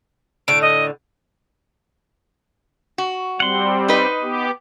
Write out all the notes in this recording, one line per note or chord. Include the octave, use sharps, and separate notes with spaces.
A2 D3 D7
D#5
F#4
G3 C4 F#5 C6
D#4 B4 D#5
B3 G4